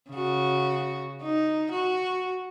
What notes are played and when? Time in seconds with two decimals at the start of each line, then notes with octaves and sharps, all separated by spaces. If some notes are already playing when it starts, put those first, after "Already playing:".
0.11 C#3 F#4
1.22 D#4
1.71 F#4